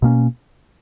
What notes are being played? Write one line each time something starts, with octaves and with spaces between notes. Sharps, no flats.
B2 A#3 C#4